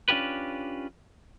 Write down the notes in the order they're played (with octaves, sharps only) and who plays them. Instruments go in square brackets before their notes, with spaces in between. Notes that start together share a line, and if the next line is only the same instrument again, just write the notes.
[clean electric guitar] C#4 D4 F4 G4 B4